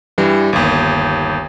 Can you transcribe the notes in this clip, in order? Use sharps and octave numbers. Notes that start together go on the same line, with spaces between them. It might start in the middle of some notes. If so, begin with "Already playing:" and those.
G2 E3 G3
G1 D#2